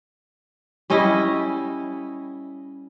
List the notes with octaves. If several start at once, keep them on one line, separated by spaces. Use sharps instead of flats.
G3 C#4 E4 D#5